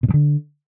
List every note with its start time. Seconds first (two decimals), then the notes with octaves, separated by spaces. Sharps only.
0.03 B2
0.08 G2
0.14 D3